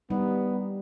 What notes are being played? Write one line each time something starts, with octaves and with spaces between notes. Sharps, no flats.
G3 B3 D#4